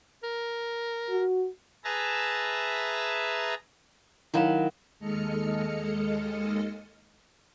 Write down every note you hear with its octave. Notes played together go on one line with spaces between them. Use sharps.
A#4
F#4
G#4 B4 E5 A5 A#5
D#3 F#3 E4 F5 B5 E7
D#2 G#3 A4 D#5 F6 C#7